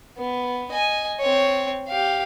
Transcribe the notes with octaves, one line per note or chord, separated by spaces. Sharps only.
B3
D#5 G#5
C4 C#5
G4 F5